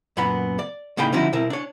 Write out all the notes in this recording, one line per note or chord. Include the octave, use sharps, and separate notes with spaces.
F#2 A#2 B3 F#5 B5
D5
A2 C#3 A#3 D#4 G5 B5
D3 F3 C#4 D#4 E4 F#4
B2 C4 E4 A#4
D4 C#5